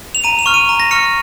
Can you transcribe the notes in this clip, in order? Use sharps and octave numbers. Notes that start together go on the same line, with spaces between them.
F7
A#5 D#7
F7
C#6 F6
D#7
A#5
A#6
C#6 F6 C#7